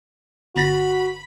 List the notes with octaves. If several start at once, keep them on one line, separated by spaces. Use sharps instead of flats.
G1 F#4 B5 A6 A#6